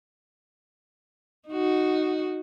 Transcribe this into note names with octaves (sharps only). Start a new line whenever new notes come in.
D#4 F#4